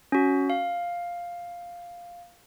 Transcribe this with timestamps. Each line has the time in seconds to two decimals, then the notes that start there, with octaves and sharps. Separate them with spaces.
0.12 C#4 F#4
0.50 F5